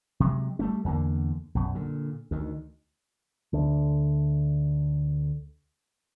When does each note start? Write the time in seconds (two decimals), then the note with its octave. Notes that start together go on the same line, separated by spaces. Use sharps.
0.20 C3 F#3 G#3
0.59 G3 A3 C#4
0.84 E2 D3 A#3
1.55 B1 F#2
1.75 A#2 D3
2.31 D2 D#3
3.53 D2 D3